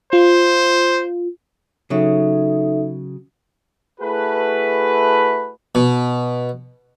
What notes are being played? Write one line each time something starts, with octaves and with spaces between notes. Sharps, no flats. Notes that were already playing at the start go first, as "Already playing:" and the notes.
F4 C5
C#3 F#3 D#4 A4 E5
A3 E4 F#4 G#4 A4 B4
B2